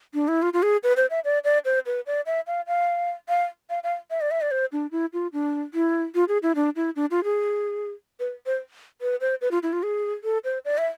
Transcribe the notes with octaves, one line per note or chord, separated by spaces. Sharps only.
D4
E4
F4
F4
G#4
B4
C5
E5
D5
D5
C5
B4
D5
E5
F5
F5
F5
F5
F5
E5
D5
E5
D5
C5
D4
E4
F4
D4
E4
F4
G#4
E4
D4
E4
D4
F4
G#4
B4
C5
B4
C5
B4
F4
E4
F4
G#4
A4
C5
D5
E5